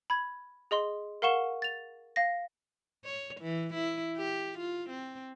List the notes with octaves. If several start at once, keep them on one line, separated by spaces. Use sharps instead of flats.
B5 G#6
G#4 D#5 C6
A#4 F5 F#5 C#6 E7 G7
A6 F7
F5 A#6
C#5
E3
E4
G4
F4
C4